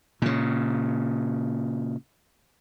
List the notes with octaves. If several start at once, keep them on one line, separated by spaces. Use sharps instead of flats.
A#2 C#3